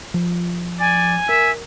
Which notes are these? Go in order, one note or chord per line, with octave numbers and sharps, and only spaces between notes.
F3
D5 G#5
A#4 E5